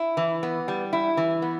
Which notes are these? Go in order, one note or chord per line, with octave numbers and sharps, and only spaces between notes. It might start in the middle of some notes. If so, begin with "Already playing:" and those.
Already playing: E4
E3
B3
G3
E4
E3
B3